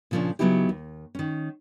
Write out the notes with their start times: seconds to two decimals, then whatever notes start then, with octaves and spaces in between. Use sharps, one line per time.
0.11 A#2 C#3 F3 B3 C#4 D4
0.39 C#3 F#3 B3 D#4 E4 G4
0.69 D#2
1.15 D#3 C#4